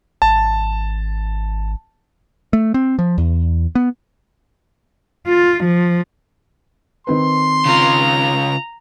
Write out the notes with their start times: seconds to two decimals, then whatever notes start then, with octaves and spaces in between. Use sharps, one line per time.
0.22 G#1 A5
2.53 A3
2.74 C4
2.99 F3
3.18 E2
3.75 B3
5.27 F4
5.64 F3
7.07 D#3 C4 B4 C6
7.66 C#3 F4 A#5